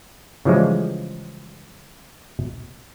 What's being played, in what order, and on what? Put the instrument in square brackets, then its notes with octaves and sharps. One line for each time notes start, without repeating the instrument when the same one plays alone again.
[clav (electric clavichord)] C#3 E3 F3 G3 G#3